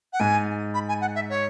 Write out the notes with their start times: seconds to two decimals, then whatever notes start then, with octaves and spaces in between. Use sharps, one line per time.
0.13 F#5
0.20 G#2 G#5
0.74 B5
0.88 G#5
1.01 F#5
1.15 E5
1.29 C#5